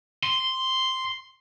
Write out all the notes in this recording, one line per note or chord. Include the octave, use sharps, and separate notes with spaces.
C6